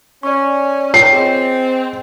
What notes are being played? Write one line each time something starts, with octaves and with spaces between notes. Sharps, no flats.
C#4 D5 C#6
F4 C#5 G5 C7
C4 G#4 D#5